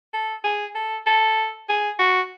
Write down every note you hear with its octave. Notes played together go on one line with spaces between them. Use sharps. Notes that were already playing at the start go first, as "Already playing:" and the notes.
A4
G#4
A4
A4
G#4
F#4